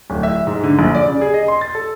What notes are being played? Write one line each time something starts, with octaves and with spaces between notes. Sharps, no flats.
D1
E5
G#2
D3
A#1
D5
C#3
G#4
D#5
C6
A6
A4